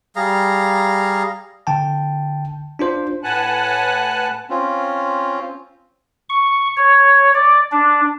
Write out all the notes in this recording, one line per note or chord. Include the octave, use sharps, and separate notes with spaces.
G3 G#4 F5 A#5
D3 G5 A5
D4 F4 C5
A2 B4 F#5 G#5 A5 F#6
C4 C#4 F4
C#6
C#5
D5
D4